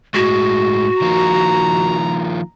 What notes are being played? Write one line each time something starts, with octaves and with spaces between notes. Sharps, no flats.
A2 G#3 F#4
D#3 F3 A#3 A#5